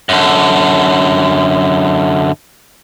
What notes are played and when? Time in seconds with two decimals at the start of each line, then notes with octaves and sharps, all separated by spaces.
0.09 F#2 D3